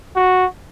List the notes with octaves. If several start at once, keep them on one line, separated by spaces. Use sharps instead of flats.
F#4